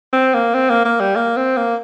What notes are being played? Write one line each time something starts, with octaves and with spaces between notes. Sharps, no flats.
C4
A#3
C4
A#3
A#3
G3
A#3
C4
A#3